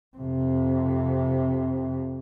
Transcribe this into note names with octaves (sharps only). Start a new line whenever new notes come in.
F2 C3